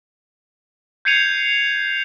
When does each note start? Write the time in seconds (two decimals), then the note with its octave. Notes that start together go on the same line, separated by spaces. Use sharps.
1.05 G6 G#6 C7 C#7 D#7 F7